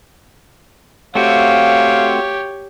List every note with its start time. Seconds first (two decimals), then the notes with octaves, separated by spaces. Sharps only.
1.15 A3 C4 F#4 G4 C#5 F5